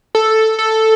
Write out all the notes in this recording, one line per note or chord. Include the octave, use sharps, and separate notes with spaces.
A4
A4